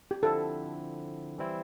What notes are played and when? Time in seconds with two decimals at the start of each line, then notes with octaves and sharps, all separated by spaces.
0.11 G4
0.23 D3 F3 C4 E4 A4
1.38 E3 G3 C4 E4